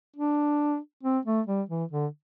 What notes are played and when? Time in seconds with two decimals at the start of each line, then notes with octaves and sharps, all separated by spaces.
0.16 D4
1.03 C4
1.25 A3
1.47 G3
1.69 E3
1.91 D3